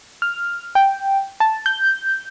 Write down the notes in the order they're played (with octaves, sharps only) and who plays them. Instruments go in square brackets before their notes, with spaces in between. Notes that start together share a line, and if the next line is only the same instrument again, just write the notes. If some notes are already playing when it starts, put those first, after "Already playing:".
[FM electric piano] F6
G5
A5
G6